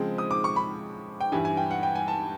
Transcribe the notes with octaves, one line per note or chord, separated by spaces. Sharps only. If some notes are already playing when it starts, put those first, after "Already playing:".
Already playing: C#3 F3 G#3 C4
D#6
D6
C#6
B5
G5
G2 E3 G3 G#5
G#5
G5
F#5
G5
G#5
A5